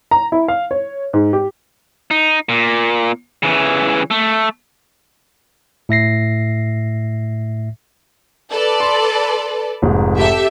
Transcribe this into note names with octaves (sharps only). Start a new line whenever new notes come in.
A#5
E4
F5
C#5
G#2
G4
D#4
A#2
C#3 E3
A3
A2 E5 A#6 C7
A4 B4 D5
C6
F1 G#2
G4 A4 E5